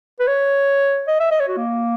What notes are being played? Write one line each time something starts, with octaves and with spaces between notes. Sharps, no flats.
B4
C#5
D#5
E5
D#5
C#5
F#4
A#3